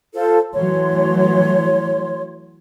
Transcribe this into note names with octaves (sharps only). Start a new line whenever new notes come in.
F4 A4 C5
E3 F#3 A3 C#5 C6